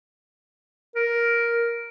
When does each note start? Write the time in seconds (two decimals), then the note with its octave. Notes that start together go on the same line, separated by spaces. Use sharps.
0.95 A#4